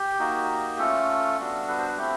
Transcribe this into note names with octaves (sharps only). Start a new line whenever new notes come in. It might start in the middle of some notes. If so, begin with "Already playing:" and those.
Already playing: G4
A#3 D#4 F#4
A3 C#4 F4 A4
G3 B3 D4 F#4
B4
C5
B4
A3 C4 E4 G4